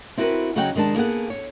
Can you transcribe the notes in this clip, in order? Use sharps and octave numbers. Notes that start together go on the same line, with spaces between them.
C4 E4 F#4 A#4 B4
C#3 F#3 D#4 C#5 F#5 G5
C3 D#3 G#3 D4 A5
A#3 B3 G#4 A4 F#5
C#5